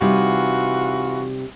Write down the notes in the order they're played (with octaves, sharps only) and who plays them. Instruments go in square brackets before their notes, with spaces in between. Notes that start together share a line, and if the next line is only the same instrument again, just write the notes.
[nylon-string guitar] C3 G3 D#4 [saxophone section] E3 F4 F#4